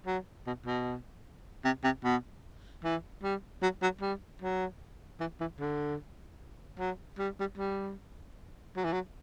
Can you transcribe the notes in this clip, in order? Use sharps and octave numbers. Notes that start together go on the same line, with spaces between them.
F#3
B2
B2
C3
C3
B2
E3
G3
F#3
F#3
G3
F#3
E3
E3
D3
F#3
G3
G3
G3
F#3
E3
F#3